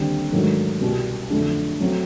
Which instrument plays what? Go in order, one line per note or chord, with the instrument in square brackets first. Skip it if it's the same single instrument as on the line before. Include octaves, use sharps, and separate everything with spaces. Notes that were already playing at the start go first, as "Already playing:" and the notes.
Already playing: [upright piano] D#2 D3 G3 C4
G#2 D#3 F#3 A3 D4
C2 B2 G3
F2 D3 F#3 A3
F#3 A3 C4